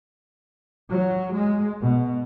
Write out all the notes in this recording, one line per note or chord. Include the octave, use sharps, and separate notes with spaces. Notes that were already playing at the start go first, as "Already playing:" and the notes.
F#3
G#3
B2